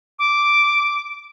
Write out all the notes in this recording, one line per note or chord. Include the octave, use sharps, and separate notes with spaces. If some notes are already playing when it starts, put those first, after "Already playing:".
D6